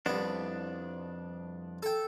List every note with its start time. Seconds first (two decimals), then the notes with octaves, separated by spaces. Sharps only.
0.06 C2 F2 B3 D4
1.83 A4 G5